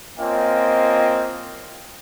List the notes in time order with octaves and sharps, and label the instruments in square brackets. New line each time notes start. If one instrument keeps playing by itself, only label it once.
[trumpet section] A#3 C4 C#4 F4 D#5 G5